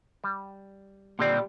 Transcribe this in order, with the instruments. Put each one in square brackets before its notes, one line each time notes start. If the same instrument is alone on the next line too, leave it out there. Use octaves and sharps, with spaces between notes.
[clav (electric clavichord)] G3
[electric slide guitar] A#2 G4 D5 [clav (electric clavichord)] D3 C4 [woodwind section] G3